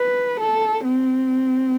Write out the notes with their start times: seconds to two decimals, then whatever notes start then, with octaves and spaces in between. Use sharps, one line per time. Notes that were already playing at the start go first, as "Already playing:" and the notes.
Already playing: B4
0.40 A4
0.85 C4